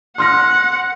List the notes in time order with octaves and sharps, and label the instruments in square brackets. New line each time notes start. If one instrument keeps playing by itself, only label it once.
[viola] F#5 [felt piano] C6 F6 A#6